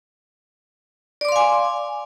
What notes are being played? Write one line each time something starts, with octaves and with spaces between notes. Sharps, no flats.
D5 F5 G#5 C6 D6